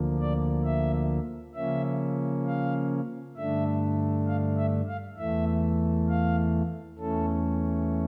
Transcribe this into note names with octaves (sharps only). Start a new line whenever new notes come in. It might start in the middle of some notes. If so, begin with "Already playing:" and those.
Already playing: D2 D3 F3 A#3
D5
E5
C#3 F3 A#3 C#4 E5
F5
G2 D3 A3 D4 E5
F5
E5
F5
E2 E3 A3 E5
F5
E2 E3 A3 C#4 A4